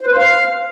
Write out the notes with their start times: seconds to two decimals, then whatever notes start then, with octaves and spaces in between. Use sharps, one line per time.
0.01 C5
0.06 B4
0.12 C5
0.17 F5